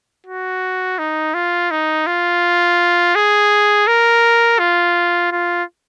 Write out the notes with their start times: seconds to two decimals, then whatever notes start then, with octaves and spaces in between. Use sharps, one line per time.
0.27 F#4
0.99 D#4
1.34 F4
1.71 D#4
2.07 F4
3.16 G#4
3.88 A#4
4.59 F4
5.32 F4